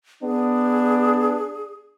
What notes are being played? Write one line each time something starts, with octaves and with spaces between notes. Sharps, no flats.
B3 D4 G#4